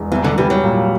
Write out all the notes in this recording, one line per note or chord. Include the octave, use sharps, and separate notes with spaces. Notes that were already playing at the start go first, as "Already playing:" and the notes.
Already playing: E1 E2
C2 E3
D3
E3 G3
F#3
A#2